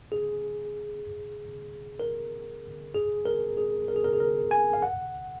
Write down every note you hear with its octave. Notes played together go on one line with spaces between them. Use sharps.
G#4
A#4
G#4
A#4
G#4
A#4
G#4
A#4
G#4
A#4
G#5
F5
F#5